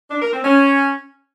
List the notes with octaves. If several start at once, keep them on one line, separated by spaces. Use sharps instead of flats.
D4
A#4
C4
C#4